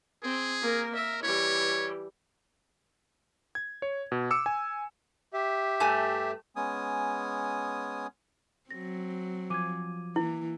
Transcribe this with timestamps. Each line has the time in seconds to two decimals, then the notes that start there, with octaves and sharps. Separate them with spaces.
0.23 C4 G#4
0.62 A#3 A#4
0.95 A#4 E5
1.23 E3 G3 C#5
3.55 G#6
3.82 C#5
4.12 B2
4.31 D6 E6 C#7
4.46 G#5
5.33 G4 E5
5.80 G2 A3 G#5
6.56 G#3 B3 C#4 G#5 D#6
8.71 F#3 C4 A#6
9.50 F3 G#5 D6 G#6
10.16 E3 A#3 E4